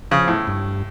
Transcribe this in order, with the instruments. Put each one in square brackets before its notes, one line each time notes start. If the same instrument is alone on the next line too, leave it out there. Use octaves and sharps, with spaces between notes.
[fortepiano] C#3 [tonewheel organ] F3
[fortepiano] A2
[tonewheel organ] G2